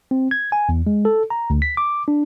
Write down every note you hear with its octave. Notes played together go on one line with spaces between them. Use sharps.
C4
G#6
G#5
E2
G#3
A4
A#5
D2
B6
D6
D4